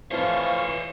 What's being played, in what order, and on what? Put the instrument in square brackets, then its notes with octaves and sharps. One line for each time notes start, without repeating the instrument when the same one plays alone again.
[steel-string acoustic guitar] F2 A2 F3 [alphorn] E3 [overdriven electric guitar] C5 C#5 [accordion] F5 C#6